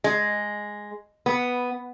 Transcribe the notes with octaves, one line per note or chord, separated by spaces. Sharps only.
G#3
B3